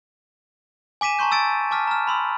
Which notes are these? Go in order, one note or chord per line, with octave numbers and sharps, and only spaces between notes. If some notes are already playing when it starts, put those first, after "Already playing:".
G#5 D6 B6 D#7 E7
A5 A#5 C6 C#6 G6
E6 A6 D7
A5 D6 F6 B6
A#5 F6
B5 C6 E6